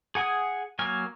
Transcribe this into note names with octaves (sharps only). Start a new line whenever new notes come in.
G#4 F#5 G#5 D#6
F#3 A#3 G#5 F6